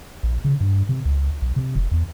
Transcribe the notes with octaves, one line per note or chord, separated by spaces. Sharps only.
A#1
C#3
G2
C3
C#2
B1
C3
F1
E2